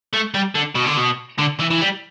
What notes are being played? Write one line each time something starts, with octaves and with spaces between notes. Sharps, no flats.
A3
G3
D3
B2
D3
B2
D3
E3
E3
G3